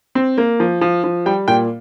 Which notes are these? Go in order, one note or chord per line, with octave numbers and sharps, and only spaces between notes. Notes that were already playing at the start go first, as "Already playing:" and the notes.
C4
A#3
F3
F3
F3
G3 G5
A#2 G5